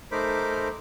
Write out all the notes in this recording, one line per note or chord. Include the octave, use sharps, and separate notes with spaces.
A3 D#4 A#4 C5 B5 D6